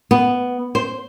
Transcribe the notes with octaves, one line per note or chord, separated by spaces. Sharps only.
B3
C5